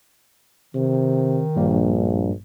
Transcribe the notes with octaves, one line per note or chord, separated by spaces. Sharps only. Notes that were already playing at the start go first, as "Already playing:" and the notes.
C3 D#3
A#1 G2 G3 A#3